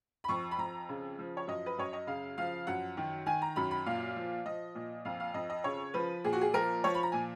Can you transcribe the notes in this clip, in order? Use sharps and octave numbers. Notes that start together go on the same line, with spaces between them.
B5
F2 C#6
B5
F2 A#5
C#3
F3
C#5
F#2 D#5
B4
F#2 C#5
D#5
C#3 F5
F3 F5
F#2 F#5
D#3
D#3 G#5
A#5
F#2 B5
B5
A#2 F5
F3
F3 D#5
A#2
F2 F5
F5
F2 D#5
D#5
C#3 C#5
F3 B4
A#2 G#4
F#4
G#4
F3 A#4
F3 C#5
B5
A#5
A#2 G#5